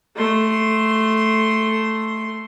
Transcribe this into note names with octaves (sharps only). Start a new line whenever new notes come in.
A3 C6